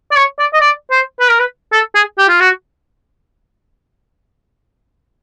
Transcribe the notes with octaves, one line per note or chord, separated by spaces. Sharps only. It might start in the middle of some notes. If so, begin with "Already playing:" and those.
D5
C#5
D5
D#5
D5
C5
B4
A#4
B4
A4
G#4
G4
F4
F#4